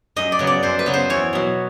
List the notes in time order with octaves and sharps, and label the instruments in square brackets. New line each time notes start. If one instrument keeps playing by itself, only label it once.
[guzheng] F#2 D#5
D5
C#3 F#3 B3
D5
F#2 C5
B4
C#3 F#3 B3
C5
E2 C#5
B2 F#3